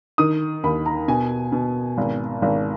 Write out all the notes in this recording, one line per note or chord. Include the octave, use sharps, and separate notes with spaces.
D#3 D#6
D#2 B5
A#5
B2 G#5
B2
G#1
G#1